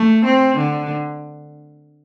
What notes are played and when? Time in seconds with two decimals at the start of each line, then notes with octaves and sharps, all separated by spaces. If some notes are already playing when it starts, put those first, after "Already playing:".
Already playing: A3
0.25 C4
0.57 D3